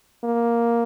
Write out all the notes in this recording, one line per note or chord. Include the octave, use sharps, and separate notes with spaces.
A#3